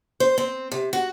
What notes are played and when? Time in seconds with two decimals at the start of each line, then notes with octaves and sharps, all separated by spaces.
0.20 C5
0.38 C4
0.72 C3
0.93 F#4